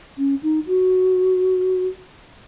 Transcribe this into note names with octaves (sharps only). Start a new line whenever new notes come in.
C#4
D#4
F#4